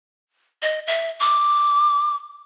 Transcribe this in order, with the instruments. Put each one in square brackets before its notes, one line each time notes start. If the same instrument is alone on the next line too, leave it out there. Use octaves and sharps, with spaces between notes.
[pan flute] D#5
E5
D6